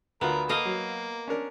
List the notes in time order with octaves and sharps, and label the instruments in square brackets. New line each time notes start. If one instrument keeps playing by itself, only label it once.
[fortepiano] D2 F4 [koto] B3 [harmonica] A#4
[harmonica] A#3 [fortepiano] A4 [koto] D#5 F5
[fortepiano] F#3
C#4 D4 A#4